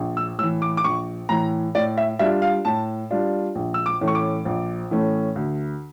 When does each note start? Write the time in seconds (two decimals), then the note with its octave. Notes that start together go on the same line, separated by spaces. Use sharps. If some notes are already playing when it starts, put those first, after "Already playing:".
Already playing: A#1
0.17 E6
0.38 A2 E6
0.43 E3
0.62 D6
0.77 D6
0.84 A#1 C#6
1.29 A2 E3 A#5
1.75 A2 D5
1.98 E5
2.19 G3 D4 F4 E5
2.42 F5
2.65 A2 A5
3.10 G3 D4 F4
3.55 A#1
3.74 E6
3.86 D6
4.01 A2 E3 A3 C#4
4.08 C#6
4.15 D6
4.45 A#1
4.91 A2 E3 A3 C#4
5.36 D2